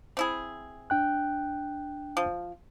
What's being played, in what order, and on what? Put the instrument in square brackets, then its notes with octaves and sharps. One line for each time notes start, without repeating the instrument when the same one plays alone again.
[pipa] C4 E4 G#4
[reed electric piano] D4 G5 F#6
[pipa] F3